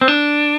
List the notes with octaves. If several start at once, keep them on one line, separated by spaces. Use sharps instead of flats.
C4
D4